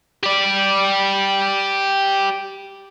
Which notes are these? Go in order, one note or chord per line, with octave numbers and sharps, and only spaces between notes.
G4 D5